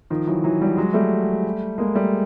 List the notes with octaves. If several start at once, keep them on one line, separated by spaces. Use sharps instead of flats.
D#3 F3
E3 F#3
E3 F#3
F3 G3
F#3 G#3
G3 A3
G#3 A#3
G3 A3